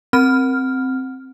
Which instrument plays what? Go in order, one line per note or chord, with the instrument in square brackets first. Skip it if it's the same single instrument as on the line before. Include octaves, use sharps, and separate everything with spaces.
[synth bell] C4 F6